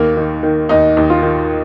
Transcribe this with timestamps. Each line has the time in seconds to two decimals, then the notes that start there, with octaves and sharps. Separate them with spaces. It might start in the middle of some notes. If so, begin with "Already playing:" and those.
Already playing: D#2 A#3
0.17 D#3
0.43 D#3
0.69 D#2 D#4
0.97 D#2
1.10 F4
1.22 D#3